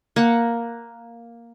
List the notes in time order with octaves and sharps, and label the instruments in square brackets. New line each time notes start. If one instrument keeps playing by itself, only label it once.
[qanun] A#3 F#5